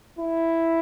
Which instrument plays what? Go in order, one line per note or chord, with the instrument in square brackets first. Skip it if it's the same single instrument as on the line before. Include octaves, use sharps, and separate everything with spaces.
[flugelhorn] E4